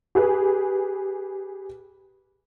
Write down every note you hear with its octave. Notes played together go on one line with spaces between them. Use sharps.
G4 G#4 B4